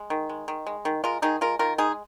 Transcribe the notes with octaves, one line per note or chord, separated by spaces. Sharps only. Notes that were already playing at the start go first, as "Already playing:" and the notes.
Already playing: G#3
D#3
G#3
D#3
G#3
D#3
G#3 F4 A#4
D#3 D#4 G#4
G#3 F4 A#4
D#3 F4 A#4
G#3 D#4 G#4